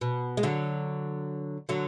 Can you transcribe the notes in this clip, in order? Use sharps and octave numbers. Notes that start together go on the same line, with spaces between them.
B2
G#3
D3 F#3
D3 F#3